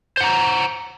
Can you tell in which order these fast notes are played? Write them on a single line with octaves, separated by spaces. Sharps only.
C5 F#5 A#5